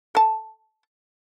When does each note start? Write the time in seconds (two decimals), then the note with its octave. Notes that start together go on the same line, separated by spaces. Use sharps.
0.15 A4 A5